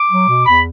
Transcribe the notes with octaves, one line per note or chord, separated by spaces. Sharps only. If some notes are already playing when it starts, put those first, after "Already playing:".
Already playing: D6
F#3
B2
E2 B5